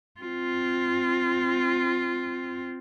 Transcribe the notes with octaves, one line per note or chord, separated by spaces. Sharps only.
C4 F4